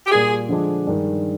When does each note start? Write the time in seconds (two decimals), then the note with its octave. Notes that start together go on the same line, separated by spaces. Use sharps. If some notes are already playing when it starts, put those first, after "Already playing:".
0.07 G4
0.11 A#2 G3 A#3 F4 G#4
0.49 D3 F3 G#3 D4
0.87 G2 D#3 G#3